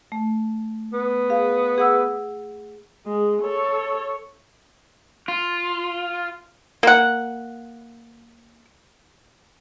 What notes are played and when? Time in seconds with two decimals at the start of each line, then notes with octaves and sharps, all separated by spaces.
0.12 A3
0.93 B3
1.30 G#4 F5
1.78 G#4 F#5 E6
3.06 G#3
3.43 A4 C#5
5.28 F4
6.83 A#3 F#5